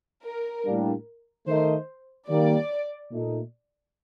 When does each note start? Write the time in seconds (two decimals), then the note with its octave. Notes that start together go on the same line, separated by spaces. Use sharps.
0.24 A#4
0.65 A2 G3 A#3 D4
1.47 D#3 A3 D#4 A#4 C5 D#5
2.28 D#3 G3 A#3 D5
3.11 A#2 A3 D#4